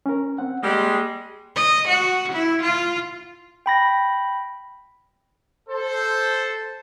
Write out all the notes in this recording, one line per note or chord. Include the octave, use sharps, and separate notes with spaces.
C#4 A#4
C4 F#5
G3 G#3 A#3
D#5
F#4
E4
F4
G5 B5 A#6
A4 C5